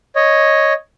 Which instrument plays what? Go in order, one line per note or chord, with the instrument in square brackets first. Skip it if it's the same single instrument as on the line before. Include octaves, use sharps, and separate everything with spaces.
[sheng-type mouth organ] C#5 D#5